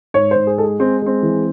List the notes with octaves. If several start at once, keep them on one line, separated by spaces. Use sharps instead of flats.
G#2 C#5
G#2 C5
G#4
G#3 A4
G#4
G#3 C4
G#3 C4
E3